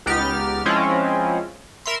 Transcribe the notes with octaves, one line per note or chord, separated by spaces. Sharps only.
C#2 B3 D#4 G4 F6 A6
F3 G#3 C4 C#4 E4 F4
A#4 E5 B5 C6